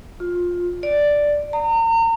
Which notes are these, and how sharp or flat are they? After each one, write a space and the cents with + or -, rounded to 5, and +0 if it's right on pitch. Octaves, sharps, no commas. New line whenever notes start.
F4 +15
D5 +0
A#5 -35